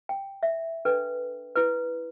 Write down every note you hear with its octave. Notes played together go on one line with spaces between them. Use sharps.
G5
E5
D4 A4 B4 G5
E4 B4